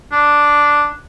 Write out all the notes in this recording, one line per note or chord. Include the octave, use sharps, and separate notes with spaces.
D4